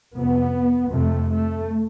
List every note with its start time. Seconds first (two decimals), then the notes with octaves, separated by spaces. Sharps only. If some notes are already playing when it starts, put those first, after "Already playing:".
0.15 F2 C3 B3
0.91 F2 C3 A3
1.29 A3